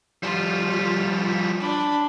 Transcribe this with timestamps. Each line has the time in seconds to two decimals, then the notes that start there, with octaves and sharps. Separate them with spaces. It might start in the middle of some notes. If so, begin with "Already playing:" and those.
0.23 F3 G3 F4
1.60 D4 B5